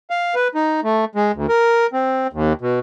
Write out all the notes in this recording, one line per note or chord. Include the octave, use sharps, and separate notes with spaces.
F5
B4
D#4
A3
G#3
D2
A#4
C4
D#2
B2